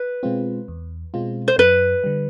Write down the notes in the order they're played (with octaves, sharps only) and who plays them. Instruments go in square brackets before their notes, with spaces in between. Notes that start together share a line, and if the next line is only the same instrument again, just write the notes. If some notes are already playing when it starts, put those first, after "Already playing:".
Already playing: [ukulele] B4
[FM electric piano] B2 G#3 C4 F4
E2
B2 G#3 C4 F4
[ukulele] C5
[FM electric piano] F#2 [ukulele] B4
[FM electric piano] D3 G3